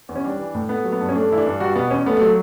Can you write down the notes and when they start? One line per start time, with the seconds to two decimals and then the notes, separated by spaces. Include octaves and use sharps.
0.09 E2
0.16 C#4
0.24 G3 D4
0.39 E3
0.55 A2
0.69 A3 B3
0.84 F#3
0.92 B3
1.01 G2
1.09 C#4
1.15 A3 D4
1.30 E3 E4
1.38 D4
1.46 G2
1.60 G3 F#4
1.76 B2 B3
1.91 E2 C#4
2.06 A3 B3
2.17 F#3 A3